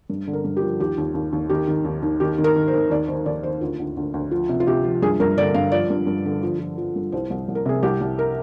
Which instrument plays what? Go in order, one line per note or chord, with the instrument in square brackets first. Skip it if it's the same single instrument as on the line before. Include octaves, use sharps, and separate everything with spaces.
[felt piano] G2
D3
A#4
G2
G4
F3
D#2 G4
D#2
D#2
D#2
D#3 G4
D#3
D#2
D#2
D#3 G4
D#3
A#4
D#3
C5
D#3
D#2 D5
D#3 C5
D#2 D5
D#3 C5
D2 F4
D2
D2
D2
F3 F4
C3
F4
C3 G4
F3
G2 G#4
G2 A#4
D3 D5
G2 F5
F3 D5
G2
G2
D3
F3
F3
F3
G2
C2 C5
C2
C2
A#4
C3 G#4
C2 G4
C2
A#4